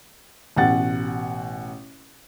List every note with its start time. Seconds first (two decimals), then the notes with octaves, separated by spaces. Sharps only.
0.56 A1 B2 F#5 A6